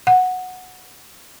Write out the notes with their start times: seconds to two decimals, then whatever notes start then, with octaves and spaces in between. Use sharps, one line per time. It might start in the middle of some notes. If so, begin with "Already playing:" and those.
0.07 F#5